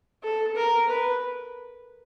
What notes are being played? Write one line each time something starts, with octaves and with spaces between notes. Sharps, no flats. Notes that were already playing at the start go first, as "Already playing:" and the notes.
A4
A#4
B4